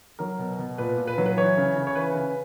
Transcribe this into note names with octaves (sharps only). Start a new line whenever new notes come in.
F#3 A#4
B2
B2
A#2 B4
A#2
B4
F#3
B4
E3 C#5
C#3
C#3
C#5
E3 B4
C#3